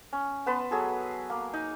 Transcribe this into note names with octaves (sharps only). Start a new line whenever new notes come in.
C#4
B3 B4 A5 C6
F#3 G#4 A4
A#3
D#4